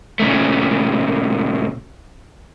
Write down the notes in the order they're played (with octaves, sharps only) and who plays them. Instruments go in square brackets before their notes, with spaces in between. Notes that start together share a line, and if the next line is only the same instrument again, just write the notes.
[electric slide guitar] A#2 C#3 A3